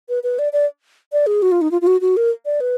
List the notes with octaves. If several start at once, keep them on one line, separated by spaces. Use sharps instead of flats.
B4
B4
D5
D5
D5
G#4
F#4
F4
D#4
F4
F4
F#4
F#4
A#4
D5
B4